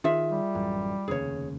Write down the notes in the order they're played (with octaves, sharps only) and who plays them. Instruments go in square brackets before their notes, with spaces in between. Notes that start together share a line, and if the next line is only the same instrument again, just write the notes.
[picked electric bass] D#3 [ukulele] F4 G#4 E5
[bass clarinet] G3
[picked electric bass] A1 F#2
[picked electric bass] F1 D#2 C#3 [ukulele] G#4 C#5